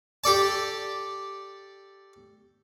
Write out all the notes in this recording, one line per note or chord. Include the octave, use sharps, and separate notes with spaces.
G4 A4 D5 A5